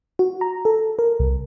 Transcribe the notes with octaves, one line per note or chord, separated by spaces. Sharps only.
F#4
A#5
A4
A#4
C2